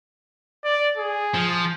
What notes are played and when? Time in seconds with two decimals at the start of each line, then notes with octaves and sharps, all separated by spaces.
0.64 D5
0.98 G#4
1.34 F3